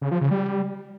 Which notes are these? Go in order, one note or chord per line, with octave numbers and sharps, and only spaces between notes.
C#3
F3
C#3
G3